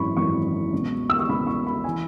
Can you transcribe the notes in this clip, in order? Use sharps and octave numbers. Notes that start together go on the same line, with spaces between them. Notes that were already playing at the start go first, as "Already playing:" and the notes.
Already playing: G#1 F#2 E3 B5 C#6
G#1 F#2 E3 C#6
C#2 B2
E6
C#6
C#2 B2 B5
C#6
B5
E3 G#5